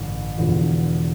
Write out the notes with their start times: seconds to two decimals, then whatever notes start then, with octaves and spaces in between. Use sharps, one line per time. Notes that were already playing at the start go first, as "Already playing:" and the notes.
Already playing: A1 G2 D3
0.38 E1 E2 D3 F3